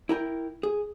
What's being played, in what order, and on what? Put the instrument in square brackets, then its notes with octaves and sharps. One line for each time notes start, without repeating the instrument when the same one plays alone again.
[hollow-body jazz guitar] E4 A#4 G5
G#4